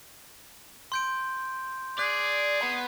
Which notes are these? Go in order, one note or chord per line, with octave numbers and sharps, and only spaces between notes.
C6 G6 D7
G#4 D5 F#6
B3 B5